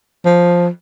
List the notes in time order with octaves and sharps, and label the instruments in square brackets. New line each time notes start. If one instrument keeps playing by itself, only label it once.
[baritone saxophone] F3